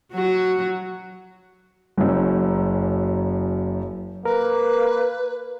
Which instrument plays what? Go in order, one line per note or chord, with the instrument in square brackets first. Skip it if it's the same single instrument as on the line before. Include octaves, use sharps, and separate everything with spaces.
[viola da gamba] F#3 F#4
[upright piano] F#1 F#2
[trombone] A#3 [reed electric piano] A#4 [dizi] B4